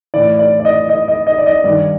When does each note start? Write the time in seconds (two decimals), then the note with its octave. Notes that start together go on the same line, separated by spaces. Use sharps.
0.14 A2 E3 D5
0.39 D5
0.60 D5
0.65 D#5
0.89 D#5
1.08 D#5
1.27 D#5
1.38 D5
1.46 D#5
1.64 G2 D#3 D5